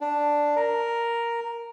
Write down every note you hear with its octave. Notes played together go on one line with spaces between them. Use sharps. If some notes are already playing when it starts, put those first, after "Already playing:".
D4
A#4